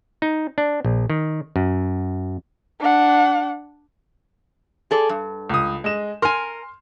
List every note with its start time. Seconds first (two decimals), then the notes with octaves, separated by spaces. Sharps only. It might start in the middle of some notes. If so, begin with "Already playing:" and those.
0.22 D#4
0.58 D4
0.85 A#1
1.10 D#3
1.56 F#2
2.81 D4 F#5
4.91 G#4 A4 D5
5.09 G2
5.50 C#2 D#6
5.84 G#3 D#5 E7
6.22 A#4 G#5 C6 F6